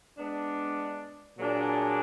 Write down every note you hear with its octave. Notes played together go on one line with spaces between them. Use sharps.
G#3 B3 D4
A#2 F#3 D4 G#4